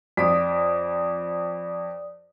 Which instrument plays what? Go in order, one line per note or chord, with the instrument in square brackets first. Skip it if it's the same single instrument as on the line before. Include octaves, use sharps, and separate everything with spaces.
[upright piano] F2 F4 B6 [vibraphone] D5 D#6